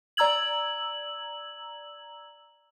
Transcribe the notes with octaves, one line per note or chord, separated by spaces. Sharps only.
D5 A#5 E6 G#6 F#7